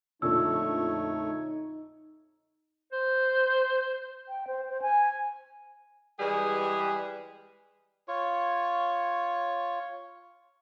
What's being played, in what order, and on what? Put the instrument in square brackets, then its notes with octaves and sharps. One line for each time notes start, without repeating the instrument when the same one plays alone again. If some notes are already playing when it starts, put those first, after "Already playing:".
[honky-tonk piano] F2 A#2 D3 [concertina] A3 C#5 [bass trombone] D#4 [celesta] E6
[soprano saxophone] C5
[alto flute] G5
C5
C5
G#5
[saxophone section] E3 G3 G#3 G4 G#4
[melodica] F4 C#5 C#6